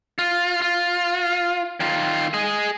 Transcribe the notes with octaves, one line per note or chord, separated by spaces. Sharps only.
F4
F4
D#3 F4
G#4 D#5